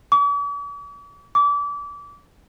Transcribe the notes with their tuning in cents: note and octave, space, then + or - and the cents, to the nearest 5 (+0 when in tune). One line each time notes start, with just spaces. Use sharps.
D6 -45
D6 -30